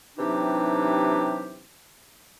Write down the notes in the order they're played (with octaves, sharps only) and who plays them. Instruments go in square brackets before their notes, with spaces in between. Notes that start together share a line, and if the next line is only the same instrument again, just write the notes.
[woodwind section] C3 E3 F#3 D4 D#4 G4